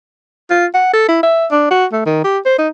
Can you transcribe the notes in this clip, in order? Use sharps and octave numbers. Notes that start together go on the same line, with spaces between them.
F4
F#5
A4
E4
E5
D4
F#4
A3
D#3
G4
C5
D#4